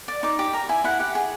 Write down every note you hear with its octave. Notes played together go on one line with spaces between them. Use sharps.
D5
D#4 D6
G4 D6
A#4 A#5
E4 G#5
E4 F#5
G4 F#5
G#4